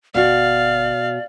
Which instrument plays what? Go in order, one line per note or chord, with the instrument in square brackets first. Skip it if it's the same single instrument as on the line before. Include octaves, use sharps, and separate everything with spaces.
[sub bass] G1 [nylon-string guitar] B2 F#4 [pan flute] D5 [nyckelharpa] F5